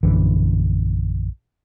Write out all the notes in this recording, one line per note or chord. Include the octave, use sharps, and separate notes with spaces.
A#1 F#2 D3 E3